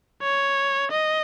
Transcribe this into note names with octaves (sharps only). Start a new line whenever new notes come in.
C#5
D#5